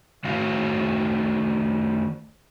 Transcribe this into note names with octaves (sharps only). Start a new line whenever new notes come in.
D#3 A3 F#4 F5